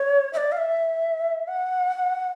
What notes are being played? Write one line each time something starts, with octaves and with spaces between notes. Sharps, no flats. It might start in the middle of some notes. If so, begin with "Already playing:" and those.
Already playing: C#5
E5
D5
F5
E5
F#5